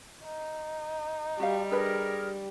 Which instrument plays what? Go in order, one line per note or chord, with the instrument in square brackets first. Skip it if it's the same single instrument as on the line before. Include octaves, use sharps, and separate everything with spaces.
[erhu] D#4
[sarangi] G3 [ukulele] F#4 G4 F5
[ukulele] D4 B4 B5 [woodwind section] G#4 A#4